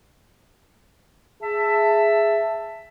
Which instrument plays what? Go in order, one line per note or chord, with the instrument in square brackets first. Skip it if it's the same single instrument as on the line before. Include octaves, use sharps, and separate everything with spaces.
[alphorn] G#4 [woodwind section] E5 A5